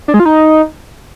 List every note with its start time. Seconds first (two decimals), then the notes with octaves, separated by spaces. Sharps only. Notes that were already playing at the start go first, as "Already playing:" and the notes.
0.08 D4
0.14 G#3
0.20 F4
0.25 D#4